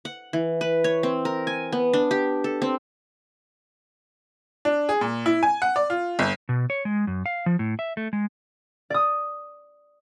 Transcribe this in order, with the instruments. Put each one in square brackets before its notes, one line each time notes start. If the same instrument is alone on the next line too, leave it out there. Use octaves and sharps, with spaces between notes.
[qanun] F#5
E3
B4
C#5
C4
A#4
G#5
B3
D4
G4
A4
C4
[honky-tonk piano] D4
G#4
A#2
E4
G#5
F#5
D5
F4
G1
[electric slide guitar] B2
C#5
G#3
F#2
F5
F3
A2
E5
A3
G#3
[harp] D5 D#6